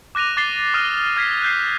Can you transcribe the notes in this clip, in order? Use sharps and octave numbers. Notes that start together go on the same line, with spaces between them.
D6 F#6 A#6 D#7 F7
D6 A6 C7 G7
D6 D#6 F6 A#6 D#7
F6 G#6 B6 C7
F#6 G6 C7